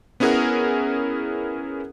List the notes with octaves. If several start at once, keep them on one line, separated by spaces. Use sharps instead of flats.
B3 C#4 E4 G#4 A#4 F#5